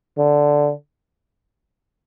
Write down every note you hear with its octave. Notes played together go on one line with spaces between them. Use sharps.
D3